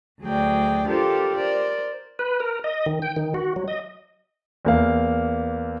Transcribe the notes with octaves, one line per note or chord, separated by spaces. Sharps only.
D2 F#3 G#4 D5 G5
D4 F4 G4 A4 A#4 C5
A#4 C5 D5
B4
A#4
D#5
D#3
G5
D#3
F#4
F#3
D#5
E2 A#3 F5